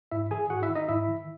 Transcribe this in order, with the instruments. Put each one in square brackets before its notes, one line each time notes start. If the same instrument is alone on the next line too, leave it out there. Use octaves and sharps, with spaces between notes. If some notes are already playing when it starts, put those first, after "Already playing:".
[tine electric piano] G#2 E4 E5
D#3 G#4 G#5
G#2 F#4 F#5
E4 E5
D#3
D#4 D#5
G#2 E4 E5
D#3